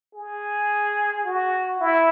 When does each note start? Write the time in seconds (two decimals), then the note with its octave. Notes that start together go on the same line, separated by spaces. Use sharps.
0.15 G#4
1.24 F#4
1.80 E4